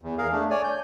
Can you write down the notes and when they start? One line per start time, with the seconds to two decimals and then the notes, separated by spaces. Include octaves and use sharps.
0.02 E2
0.18 G#4 A#4 F5
0.32 A3 D4
0.50 C#5 D5 G#5
0.64 G6